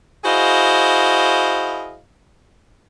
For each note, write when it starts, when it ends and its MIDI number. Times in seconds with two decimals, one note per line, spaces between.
0.24 1.99 64
0.24 1.99 66
0.24 1.99 68
0.24 1.99 72
0.24 1.99 75
0.24 1.99 77